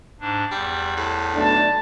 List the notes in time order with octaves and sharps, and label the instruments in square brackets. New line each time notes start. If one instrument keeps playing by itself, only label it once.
[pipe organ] G#2 D4
[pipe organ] E2 [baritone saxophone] G3
[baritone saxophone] A2
[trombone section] B1 A3 D4 [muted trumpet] A5